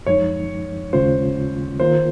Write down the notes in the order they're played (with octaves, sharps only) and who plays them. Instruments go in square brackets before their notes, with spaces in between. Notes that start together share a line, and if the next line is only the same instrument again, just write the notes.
[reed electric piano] F#2 F3 G#3 D#4 [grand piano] C#5
[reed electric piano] D#2 C#3 G#3 C#4 F4 [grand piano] C5
[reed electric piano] D#3 A#3 F4 A#4 [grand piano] C5